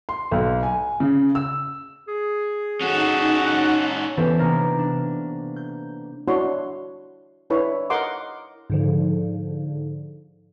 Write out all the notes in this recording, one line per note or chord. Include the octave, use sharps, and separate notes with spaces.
C6
B1
G#5
C#3
E6
G#4
C#4 D#4 F#4 A4 F#5
E3 B3 C#4 G4 A4 C5
C3 A#3 C4 D4 A#4
D4
G6
D4 E4 F#4 C#5 C6
D4 E4 B4 C#5
A#4 D#5 F#5 C6 D6
G#2 D3 F3